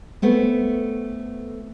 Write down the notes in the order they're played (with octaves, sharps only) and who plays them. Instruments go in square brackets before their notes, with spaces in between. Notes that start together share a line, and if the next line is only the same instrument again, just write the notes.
[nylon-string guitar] A3 B3 C4